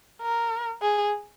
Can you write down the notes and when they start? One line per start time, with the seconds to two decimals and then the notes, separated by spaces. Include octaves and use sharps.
0.23 A#4
0.82 G#4